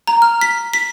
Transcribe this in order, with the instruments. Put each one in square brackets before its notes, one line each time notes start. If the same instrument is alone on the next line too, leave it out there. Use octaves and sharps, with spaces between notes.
[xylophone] A#5
F6
B6
B6